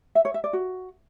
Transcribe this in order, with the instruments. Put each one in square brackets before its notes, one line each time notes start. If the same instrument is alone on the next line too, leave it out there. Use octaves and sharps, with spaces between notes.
[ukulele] E5
C#5
E5
D5
F#4